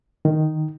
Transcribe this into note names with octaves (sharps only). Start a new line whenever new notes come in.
D#3